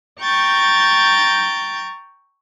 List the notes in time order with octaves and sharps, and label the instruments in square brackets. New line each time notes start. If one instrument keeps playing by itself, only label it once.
[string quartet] G5 A#5 C#6 G6 A6